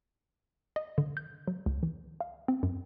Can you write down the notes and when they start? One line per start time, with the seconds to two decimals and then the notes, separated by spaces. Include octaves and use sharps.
0.76 D#5
0.98 D3
1.17 G6
1.48 F#3
1.66 C#2
1.83 E3
2.21 F5
2.48 C4
2.63 F#2